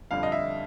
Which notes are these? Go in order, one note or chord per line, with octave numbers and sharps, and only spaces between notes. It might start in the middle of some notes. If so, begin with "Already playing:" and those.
F2 D3 G3 F5
D#5
E5